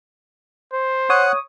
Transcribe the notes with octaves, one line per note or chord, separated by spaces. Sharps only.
C5
C#5 F#5 D#6